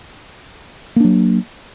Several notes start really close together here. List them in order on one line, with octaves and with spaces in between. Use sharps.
A#3 D4 F#3